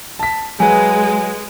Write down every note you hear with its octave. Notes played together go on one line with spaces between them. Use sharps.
A5 B6
F#3 G#3 B4 G#5